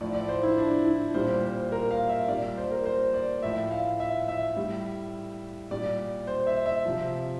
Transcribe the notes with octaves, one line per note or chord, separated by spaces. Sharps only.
A2 F3 D5
D5
C5
E4
D4
E4
A#2 G3 C5
C5
A#4
F5
E5
A#2 G3 D5
D5
C5
A#4
C5
D5
A2 F3 E5
F5
E5
E5
A2 G3
A#2 G3 D5
C5
E5
E5
C3 F3